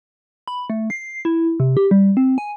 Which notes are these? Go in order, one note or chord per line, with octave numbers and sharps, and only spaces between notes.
B5
A3
C7
E4
C3
G4
G3
C4
G#5